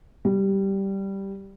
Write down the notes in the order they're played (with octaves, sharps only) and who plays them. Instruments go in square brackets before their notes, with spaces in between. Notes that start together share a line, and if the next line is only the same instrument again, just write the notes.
[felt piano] G3